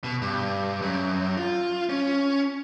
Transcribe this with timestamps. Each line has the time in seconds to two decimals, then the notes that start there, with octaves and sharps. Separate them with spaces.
0.04 B2
0.22 G2
0.82 F#2
1.37 F4
1.89 C#4